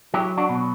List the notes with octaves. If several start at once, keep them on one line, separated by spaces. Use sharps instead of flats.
F#3 E4 G4
D4 F#4
B2